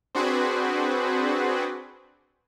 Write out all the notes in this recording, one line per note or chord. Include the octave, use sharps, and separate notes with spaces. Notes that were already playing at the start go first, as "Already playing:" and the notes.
C4 D4 F#4 G#4 B4 C5